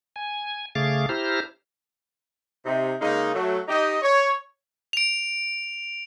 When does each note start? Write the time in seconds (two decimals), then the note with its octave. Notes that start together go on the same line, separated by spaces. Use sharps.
0.16 G#5
0.75 C#3 A3 G#4 F5 D6 A6
1.09 E4 G4 C5 A#5 F6
2.65 C3 D#4
3.01 C#3 G#3 A#3 D#4
3.34 F#3 A3
3.68 D#4 G4 D#5
4.02 C#5
4.93 D7 F7